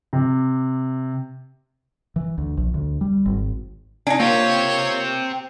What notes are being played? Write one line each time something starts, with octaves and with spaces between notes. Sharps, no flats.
C3
E3
D2
A#1
D2
G3
G#1
D4 D#4 G#5
A#3 C4 F4 G4 C#5